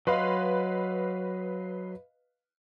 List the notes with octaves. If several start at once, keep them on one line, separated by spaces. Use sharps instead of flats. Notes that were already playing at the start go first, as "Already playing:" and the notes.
F#3 B4 D#5 F5 C6